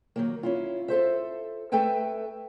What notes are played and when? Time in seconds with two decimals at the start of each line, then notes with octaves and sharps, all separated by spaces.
0.16 D#3 F#3 A#3
0.43 C#4 E4 F4
0.88 F4 A4 C5 E5
1.72 A3 A4 B4 E5 G5 G#5